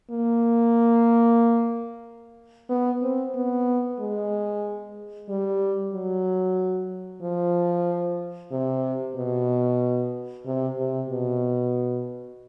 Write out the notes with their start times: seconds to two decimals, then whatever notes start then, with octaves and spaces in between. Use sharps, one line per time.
0.11 A#3
2.70 B3
3.02 C4
3.35 B3
3.99 G#3
5.29 G3
5.93 F#3
7.22 F3
8.52 C3
9.16 B2
10.46 C3
10.78 C3
11.10 B2